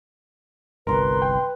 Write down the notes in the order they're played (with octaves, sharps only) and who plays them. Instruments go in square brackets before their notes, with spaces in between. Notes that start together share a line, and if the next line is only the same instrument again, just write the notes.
[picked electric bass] G1 C2 [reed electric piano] A#4 A#5 [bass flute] B4 [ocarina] C6
[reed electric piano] G5